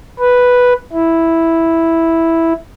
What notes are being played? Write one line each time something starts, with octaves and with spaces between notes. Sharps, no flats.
B4
E4